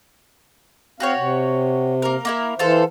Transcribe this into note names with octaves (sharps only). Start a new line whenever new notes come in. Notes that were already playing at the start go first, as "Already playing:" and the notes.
C4 F#4 G4 C#5 F5
C3
A#3 A#4
A#3 E4 A#4
E3 F4 A4 C5